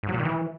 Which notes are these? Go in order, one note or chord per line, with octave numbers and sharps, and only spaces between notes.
G#2
F#3
A#2
D#3
E3